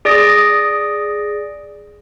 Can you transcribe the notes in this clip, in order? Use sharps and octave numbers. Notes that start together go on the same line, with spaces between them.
G#4 D5 D#6 A6 A#6 D7